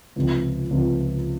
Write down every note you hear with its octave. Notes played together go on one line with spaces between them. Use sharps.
C#2 C3 F3
C#2 C3 F3